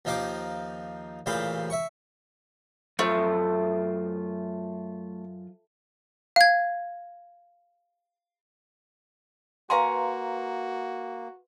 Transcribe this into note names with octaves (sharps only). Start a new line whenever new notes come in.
D#2 F3 D#4 F5 D6
A1 A#2 C#3 C5 F5 B5
E5 C#6
F#2 A3 F4 C5
F5 G#6
A#3 F#4 B4 F5 G#5 A#5 C6 C#6